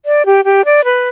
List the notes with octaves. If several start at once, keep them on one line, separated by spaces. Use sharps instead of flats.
D5
G4
G4
D5
B4